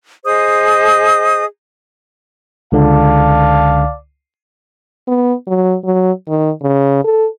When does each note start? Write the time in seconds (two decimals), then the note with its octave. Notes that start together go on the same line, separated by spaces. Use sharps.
0.24 G#4 C5 D#5 D#6
2.72 C#2 D3 D5 F5 A5
5.08 B3
5.47 F#3
5.84 F#3
6.28 D#3
6.62 C#3
7.04 A4